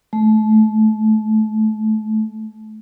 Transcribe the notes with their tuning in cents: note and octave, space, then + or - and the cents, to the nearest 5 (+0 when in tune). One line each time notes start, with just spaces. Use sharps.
A3 -30